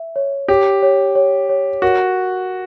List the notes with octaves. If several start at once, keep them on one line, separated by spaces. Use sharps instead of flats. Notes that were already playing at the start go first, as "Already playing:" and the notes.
Already playing: E5
C#5
G4 C#5
C#5
C#5
C#5
F#4 A#4